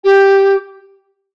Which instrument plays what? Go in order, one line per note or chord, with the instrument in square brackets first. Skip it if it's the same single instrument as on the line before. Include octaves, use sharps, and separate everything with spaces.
[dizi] G4